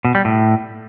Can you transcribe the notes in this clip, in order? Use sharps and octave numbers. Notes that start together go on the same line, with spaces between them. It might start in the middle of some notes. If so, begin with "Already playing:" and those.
B2
G3
A2